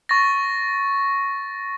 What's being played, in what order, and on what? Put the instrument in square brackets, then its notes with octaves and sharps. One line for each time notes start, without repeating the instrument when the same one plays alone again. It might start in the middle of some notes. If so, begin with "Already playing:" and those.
[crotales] C#6 A6 A#6